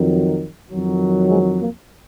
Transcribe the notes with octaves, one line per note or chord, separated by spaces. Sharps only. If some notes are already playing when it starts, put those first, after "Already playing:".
Already playing: F2 D#3 F#3
F2 D#3 F#3
G#3 C4
A#3